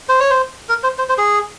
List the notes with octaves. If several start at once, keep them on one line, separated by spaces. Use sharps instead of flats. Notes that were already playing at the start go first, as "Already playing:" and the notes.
C5
C#5
C5
A#4
C5
C5
C5
G#4